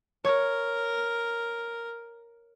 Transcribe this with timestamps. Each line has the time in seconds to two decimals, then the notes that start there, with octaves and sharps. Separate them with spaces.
0.25 A#4 C#5